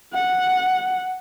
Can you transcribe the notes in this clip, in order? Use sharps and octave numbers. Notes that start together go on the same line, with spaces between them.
F#5